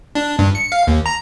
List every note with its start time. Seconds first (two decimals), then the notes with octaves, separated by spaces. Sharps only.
0.15 D4
0.39 G2
0.55 C#7
0.72 F5
0.87 D#2
1.06 A#5